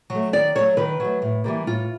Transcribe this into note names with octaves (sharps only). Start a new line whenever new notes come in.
F#3
A3
D#3 D5
F#3 A3 C#5
D#3 B4
F#3 A3
A2
E3 G3 A#3
A2 F4